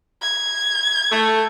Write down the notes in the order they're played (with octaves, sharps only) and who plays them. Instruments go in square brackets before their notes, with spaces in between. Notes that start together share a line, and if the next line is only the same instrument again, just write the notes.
[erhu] G#6
[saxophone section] A3